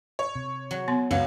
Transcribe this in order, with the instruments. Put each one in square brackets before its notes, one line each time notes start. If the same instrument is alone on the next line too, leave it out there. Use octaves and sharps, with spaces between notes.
[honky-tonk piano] C#5
[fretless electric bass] C3
[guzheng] F#3
[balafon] B3 C6
[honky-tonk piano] C#2 [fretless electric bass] F#2 [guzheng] F#3 [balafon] F5